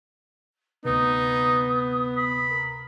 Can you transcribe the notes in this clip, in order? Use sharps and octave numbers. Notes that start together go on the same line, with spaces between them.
D2 C3 B3 D#4 D#6
B5
A#4